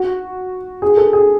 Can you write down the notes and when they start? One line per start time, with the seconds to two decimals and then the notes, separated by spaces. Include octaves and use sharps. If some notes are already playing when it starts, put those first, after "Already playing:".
Already playing: F#4
0.82 G#4
0.97 A4
1.13 G#4